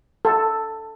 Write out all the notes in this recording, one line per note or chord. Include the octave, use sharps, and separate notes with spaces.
A4